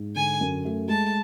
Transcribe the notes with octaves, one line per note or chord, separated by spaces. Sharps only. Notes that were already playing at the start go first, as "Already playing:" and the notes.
Already playing: G#2
D3 G#5
F#2
A3
G#3 A5